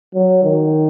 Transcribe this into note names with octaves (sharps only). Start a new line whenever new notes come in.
F#3
D#3